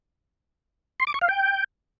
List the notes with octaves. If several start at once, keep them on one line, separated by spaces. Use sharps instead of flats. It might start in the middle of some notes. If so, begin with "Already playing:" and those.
C6
D6
C#6
F5
G5